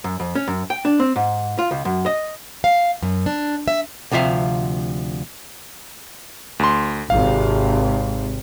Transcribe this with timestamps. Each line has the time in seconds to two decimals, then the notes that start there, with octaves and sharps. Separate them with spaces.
0.04 F#2
0.20 F2
0.35 C#4
0.48 F#2
0.70 G5
0.85 D4
1.00 C4
1.16 G#2
1.59 F4
1.71 C#2
1.85 F#2
2.06 D#5
2.64 F5
3.02 F#2
3.26 D4
3.68 E5
4.11 D2 C3 F3 E5 F5
6.59 D2 C6
7.10 G#1 C3 F5